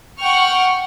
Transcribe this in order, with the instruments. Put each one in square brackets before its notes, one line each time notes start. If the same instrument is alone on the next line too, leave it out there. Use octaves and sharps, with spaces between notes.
[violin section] F#5 G5 C#6 F6